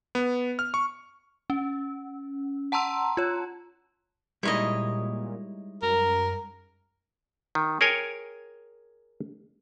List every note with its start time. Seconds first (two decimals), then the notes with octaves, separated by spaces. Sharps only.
0.15 B3
0.59 F6
0.74 C#6
1.50 C#4
2.72 F#5 A5 A#5 C6 E6
3.17 F4 C#5
4.43 A#2 G3 G#3 D#4 E4 C#5 D#5
5.83 F#2 A#4
7.55 D#3
7.81 G#4 A#4 C#5 G5 G#5